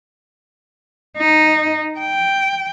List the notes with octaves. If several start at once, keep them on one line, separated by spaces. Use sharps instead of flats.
D#4
G5